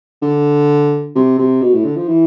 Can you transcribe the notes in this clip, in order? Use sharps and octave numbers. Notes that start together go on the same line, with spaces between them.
D3
C3
C3
B2
A2
D3
F3
E3